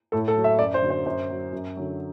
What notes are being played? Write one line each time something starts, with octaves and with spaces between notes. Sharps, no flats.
A2 A4
A4
F#3
E5
F#2 D5
C5
D3 F#3
C5
F#2 C5
F#3
F#2
D3 F#3